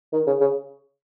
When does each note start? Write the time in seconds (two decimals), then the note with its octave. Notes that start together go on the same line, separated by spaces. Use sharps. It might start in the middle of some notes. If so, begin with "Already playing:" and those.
0.13 D#3
0.27 C#3
0.40 C#3